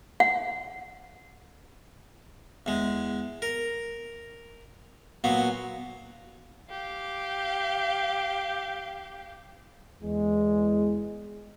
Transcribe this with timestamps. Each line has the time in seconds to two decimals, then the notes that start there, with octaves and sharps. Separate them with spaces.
0.20 F#5
2.66 E2 G#3
3.42 A#4
5.24 A#2 F#3 B3
6.70 G4 F5
10.03 E2 G#3